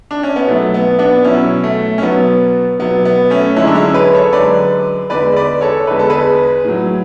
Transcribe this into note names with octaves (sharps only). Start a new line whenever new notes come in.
D4
C#4
B3
B2 F#3 A3
B3
B3 D4
B2 F#3 C#4 E4
A3
C#4
B2 F#3 B3
B2 F#3 B3
B3
A3 C#4
F#2 D3 G#3 C#4 E4
D4
C#4 E4
G#4 B4
A4 C#5
F#2 D3 G#3 B4 D5
E2 D3 G#3 B4 D5
B4 D5
A4 C#5
E2 D3 G#3 B4
A4
G#4 B4
A2 F#3